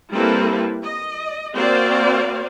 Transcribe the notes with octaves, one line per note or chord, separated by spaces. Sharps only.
G3 A#3 C4 E4 A4 B4
D#5
A#3 C4 F#4 C5 D5 F5